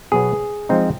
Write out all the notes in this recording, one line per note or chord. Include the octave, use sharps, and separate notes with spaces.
B2 F#3 B3 G#4
F3 G#3 C4 D#4